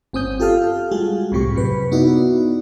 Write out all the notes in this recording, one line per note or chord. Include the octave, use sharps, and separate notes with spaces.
G1 C4 C#4 D#6 G6
F4 G4 A4 F5 F6
G3 G#3 F4 F#4 G#4
C2 A2 C3 G4 C#6
F#2 C3 B4
B3 D#4 E4 F#4 D5